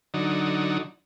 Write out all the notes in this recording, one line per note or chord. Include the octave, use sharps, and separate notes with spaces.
D3 F#3 D#4